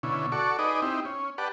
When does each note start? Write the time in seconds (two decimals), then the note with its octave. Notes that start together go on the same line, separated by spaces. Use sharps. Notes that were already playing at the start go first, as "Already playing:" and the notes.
0.03 B2 D3 C#4 E4
0.32 F#4 A4 D5 C#6
0.59 D#4 G#4 B4 D5 D#5
0.82 C4 D#4 E4 G4
1.05 C#4
1.38 G4 B4 D5 F#5 A5